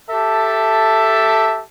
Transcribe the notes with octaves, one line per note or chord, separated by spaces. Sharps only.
G4 A4 E5 A5